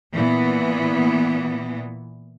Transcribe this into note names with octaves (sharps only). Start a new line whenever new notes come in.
A#2 E3 B3